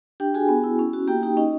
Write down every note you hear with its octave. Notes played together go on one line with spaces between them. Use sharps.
D4 G4 G5
F#4 G#4 G#5
B3
E4
C#4
F#4
A#3 G4 G5
D#4 G4 G5
C#4 D#4 D#5